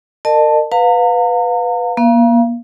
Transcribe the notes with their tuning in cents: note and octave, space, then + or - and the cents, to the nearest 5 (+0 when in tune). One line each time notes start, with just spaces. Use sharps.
A#4 -30 D#5 -40 A5 +0
B4 +0 F5 +25 A#5 -35
A#3 +35 F5 -30